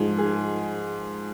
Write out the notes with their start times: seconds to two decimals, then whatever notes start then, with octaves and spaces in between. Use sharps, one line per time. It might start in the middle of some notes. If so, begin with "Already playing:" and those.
Already playing: G#2 F3 G#4
0.18 G#4